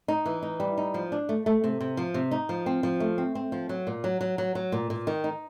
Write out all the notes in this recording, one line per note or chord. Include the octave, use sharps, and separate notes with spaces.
D#4
E3
D#4
G3
D#4
F3
D4
A3
A3
C3
C3
F3
C3
D#4
F3
C4
F3
A3
C4
C4
F3
F#3
A#2
F#3
F#3
F#3
F#3
A#2
A#2
D#3
D#4